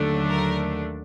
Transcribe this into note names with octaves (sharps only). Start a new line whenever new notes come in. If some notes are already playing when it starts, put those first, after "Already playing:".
Already playing: D#2 D3 F#3 A3 D4
A#4